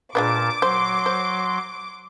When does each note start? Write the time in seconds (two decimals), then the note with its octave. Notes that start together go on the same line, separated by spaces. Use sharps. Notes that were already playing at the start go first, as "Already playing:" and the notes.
0.15 A#2 G#3 D4 B4 A5 D6
0.62 F#3 C5 C6
1.06 C5